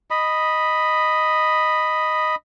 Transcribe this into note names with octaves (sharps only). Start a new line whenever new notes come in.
D#5 B5